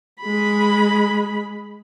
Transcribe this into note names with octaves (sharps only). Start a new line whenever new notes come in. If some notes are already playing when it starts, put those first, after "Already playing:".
G#3 B5